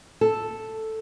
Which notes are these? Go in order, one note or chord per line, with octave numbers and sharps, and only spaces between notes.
A4